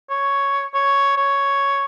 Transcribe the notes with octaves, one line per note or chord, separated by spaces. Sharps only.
C#5
C#5
C#5